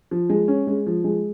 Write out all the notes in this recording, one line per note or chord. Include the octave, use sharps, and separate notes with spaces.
F3
G#3
C#4
G#3
F3
G#3